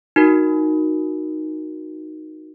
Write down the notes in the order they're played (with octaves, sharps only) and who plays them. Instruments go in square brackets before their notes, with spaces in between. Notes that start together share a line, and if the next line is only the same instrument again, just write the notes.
[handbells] D#4 F#4 A#4